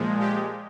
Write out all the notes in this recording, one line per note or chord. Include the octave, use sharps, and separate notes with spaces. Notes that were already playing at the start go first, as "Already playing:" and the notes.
Already playing: A#2 F3 G#3
G4